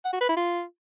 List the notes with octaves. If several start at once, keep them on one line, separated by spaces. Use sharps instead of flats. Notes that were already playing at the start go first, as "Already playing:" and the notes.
F#5
F#4
B4
E4
F4